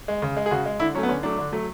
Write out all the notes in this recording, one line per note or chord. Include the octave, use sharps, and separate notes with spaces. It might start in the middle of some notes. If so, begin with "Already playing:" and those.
G#3
C#3
G#3
G#4
C#3 F#4
G#3
D3 E4
F#3 A3 C#4
B3
D3 C#4
F#3 A3 D4
D3
F#3 A3